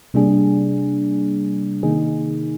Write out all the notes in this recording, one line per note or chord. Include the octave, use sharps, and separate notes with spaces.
C3 G3 A#3 D4 G#4
C3 D#3 A#3 D#4 G#4